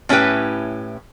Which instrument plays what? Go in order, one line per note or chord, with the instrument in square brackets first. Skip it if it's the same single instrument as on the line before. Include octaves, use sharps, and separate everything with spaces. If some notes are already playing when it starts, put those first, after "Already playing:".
[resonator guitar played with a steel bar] A2 C#4 E4 G4 B4 G5